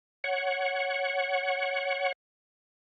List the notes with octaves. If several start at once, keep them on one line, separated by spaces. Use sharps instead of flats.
C#5 F#5